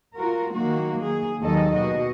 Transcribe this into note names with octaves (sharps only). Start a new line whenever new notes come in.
F4 F#4 A#4
D#3 F#3 A#3 F#4
G#4
D#2 D#3 F#3 A4 D#5
B2 F#4 D#5